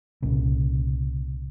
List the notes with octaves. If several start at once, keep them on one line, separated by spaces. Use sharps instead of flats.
C2 A#2 C#3